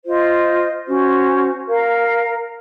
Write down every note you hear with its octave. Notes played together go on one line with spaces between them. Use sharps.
F4 C5 D#5
C#4 F#4 C5
A#4 F5 A#5